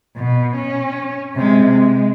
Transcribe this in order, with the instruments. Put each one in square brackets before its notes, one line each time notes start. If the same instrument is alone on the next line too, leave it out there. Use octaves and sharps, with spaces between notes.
[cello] B2
C#4
C3 G#3
G#3